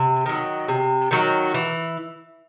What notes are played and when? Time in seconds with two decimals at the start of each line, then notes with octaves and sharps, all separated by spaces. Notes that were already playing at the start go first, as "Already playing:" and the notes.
Already playing: C3
0.26 D#3 F#3
0.68 C3
1.11 D#3 F#3
1.54 E3